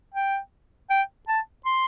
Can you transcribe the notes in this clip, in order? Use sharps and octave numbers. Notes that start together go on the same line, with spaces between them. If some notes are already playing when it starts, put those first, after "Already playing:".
G5
G5
A5
C6